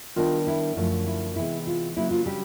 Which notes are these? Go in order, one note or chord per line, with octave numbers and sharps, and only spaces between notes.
D#3 G3 B3 D4 F4
E4
F#2 D3 F3 A3
E4
C3 E3 G#3 B3 E4
F4
C#3 F#3 A#3 D4 E4
F4
G3 G4